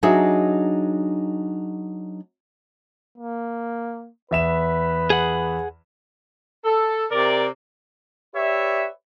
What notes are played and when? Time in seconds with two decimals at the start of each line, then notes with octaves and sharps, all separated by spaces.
0.03 F#3 D4 D#4 G#4 D#5 E5
3.18 A#3
4.31 E2 B4 E5 E7
5.10 G#4 F#5
6.64 A4
7.11 C3 A#4 D5
8.35 G4 B4 C#5 D5 E5